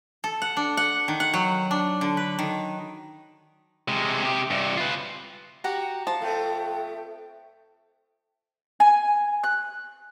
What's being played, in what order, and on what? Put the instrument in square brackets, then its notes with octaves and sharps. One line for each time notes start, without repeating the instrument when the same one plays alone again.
[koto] A4
F#5
D4
F#5
D#3
F#5
F#3
D4
D3
B4
D#3
[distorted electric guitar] C3 G#3
C3 G4
G2 C3
F4 B4
[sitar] F#4 [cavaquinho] G4 F#5 A#5
[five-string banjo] F3 [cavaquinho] A5
[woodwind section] F2 G5 [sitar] A3 B3
[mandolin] G#5
F#6